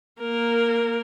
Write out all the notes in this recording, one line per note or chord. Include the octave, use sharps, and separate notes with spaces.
A#3 A#4